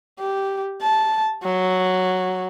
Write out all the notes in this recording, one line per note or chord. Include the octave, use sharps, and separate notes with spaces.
G4
A5
F#3